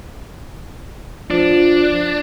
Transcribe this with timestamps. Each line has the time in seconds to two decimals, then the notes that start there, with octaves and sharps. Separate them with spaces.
1.31 F3 D4